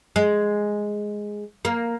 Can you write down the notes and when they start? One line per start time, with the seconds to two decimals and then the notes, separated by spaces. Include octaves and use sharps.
0.16 G#3
1.65 A#3